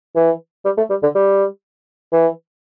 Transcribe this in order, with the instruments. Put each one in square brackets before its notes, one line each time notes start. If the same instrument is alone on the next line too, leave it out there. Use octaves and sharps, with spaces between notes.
[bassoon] E3
G3
A3
G3
D3
G3
E3